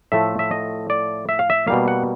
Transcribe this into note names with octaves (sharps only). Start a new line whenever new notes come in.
A2 F3 A3 E5
E5
D#5
D5
E5
F5
E5
B2 G3 A#3 F5
F#5